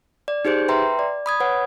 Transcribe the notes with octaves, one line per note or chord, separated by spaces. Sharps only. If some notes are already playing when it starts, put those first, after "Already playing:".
D5
D#4 G4 G#4 C5 G6
B4 E5 G5 A#5 C6
D5
B5 D#6 G#6
B4 C#5 F#5